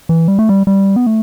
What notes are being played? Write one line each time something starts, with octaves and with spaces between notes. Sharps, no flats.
E3
G3
A3
G3
G3
B3
A3